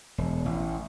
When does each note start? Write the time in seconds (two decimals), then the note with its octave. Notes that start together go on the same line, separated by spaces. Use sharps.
0.18 E1
0.46 A1